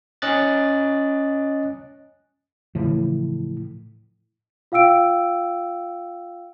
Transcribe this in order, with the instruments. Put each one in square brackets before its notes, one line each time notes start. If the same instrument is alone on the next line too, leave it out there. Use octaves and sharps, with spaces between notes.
[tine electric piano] C#4 D#5 F#6 A6
[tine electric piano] A2 [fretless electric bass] C#3 E3 F3
[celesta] F4 F5 G5 E6 D7